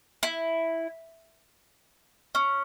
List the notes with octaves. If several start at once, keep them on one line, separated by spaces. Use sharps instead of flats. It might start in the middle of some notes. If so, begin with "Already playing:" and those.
E4
C#4